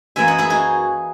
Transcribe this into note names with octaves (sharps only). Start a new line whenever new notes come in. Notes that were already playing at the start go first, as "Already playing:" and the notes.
F#2 E3 A#3 E5 G#5
D#5 F#5
E4 G#4
D#4 F#4